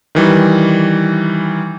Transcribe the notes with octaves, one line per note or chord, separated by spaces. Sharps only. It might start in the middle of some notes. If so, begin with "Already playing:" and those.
D#3 E3 G3